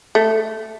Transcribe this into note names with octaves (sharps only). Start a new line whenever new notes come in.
A3